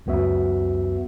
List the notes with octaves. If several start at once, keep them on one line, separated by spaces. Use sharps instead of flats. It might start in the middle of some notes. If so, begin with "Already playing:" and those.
C#2 F#2 B3 F#4 E5